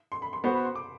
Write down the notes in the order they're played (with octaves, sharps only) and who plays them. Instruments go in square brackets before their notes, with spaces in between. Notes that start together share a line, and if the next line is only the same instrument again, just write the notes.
[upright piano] C6
B5
C6
[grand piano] B3 F#4 C5 [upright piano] B5
[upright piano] B5
C6
D6